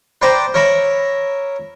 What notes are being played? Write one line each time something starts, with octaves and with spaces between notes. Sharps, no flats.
B4 C5 D5 G5 A#5
A#4 C#5 E5 A#5 B5